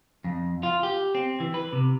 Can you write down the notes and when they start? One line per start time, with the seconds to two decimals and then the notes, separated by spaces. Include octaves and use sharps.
0.24 F2
0.63 F4
0.83 G4
1.15 C4
1.40 E3
1.54 B4
1.73 C3